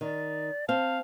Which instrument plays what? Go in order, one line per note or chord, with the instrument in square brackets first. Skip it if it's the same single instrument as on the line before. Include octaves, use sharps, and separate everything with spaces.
[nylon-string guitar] D#3 [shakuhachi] D5
[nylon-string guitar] C4 [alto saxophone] F5 [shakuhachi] A5